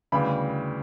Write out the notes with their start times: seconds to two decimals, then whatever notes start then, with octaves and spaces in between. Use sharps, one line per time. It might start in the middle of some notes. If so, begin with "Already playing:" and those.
0.12 D2 C#3 E3 G3 B5